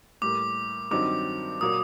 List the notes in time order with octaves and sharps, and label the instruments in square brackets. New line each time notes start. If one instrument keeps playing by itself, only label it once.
[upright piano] A2 G3 A#3 [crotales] D6
[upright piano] G2 D#3 F#3 C4 D#4 [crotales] D6
[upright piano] A#2 F#3 A#3 [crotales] D#6